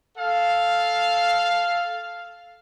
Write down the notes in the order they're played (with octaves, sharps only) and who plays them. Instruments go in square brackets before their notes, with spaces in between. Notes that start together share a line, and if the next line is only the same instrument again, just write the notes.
[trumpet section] A4 F5